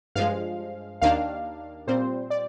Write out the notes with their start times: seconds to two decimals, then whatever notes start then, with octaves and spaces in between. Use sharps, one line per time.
0.15 G2 F3 G#3 F5
1.02 D#2 D#3 A#3 D4 F5
1.87 A#2 G3 C4 C5
2.30 D5